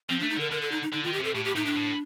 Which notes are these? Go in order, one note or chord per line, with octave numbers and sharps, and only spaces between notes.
F3 C4
D4
A3
D#4
D3 A#4
D3 A#4
A4
D#4
D#4
D3 D#4
F4
D#3
G4
C3 A4
A2 G4
G4
A2 D#4
D4
A2